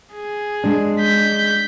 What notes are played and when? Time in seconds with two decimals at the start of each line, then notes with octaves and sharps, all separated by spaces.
0.14 G#4
0.64 G#3 D4
1.01 G6 B6